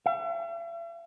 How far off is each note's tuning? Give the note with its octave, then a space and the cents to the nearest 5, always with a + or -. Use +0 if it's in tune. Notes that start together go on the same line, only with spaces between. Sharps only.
E5 +45